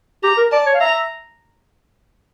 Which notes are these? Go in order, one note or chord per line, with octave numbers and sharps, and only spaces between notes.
G4 A#5
A#4
D5 A5
C#5
F5
E5 A#5